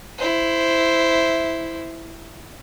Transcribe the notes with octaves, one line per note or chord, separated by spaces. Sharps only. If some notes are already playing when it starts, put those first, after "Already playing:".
E4 C5